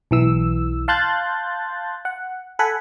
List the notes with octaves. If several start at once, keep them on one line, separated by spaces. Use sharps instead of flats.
B1 E3 E6
F5 A5 C6 F#6 G6 A6
F#5
A4 F#5 G#5 B5